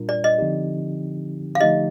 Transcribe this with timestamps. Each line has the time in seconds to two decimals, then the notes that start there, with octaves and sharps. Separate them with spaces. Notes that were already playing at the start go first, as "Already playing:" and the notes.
Already playing: A#2 G3 D4 F4 A#4
0.09 D5
0.24 D#5
0.38 D3 F3 C4 D#4 G4
1.55 F5
1.61 D3 F3 A3 D#4 G4 D#5